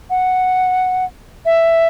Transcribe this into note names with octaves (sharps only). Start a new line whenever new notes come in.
F#5
E5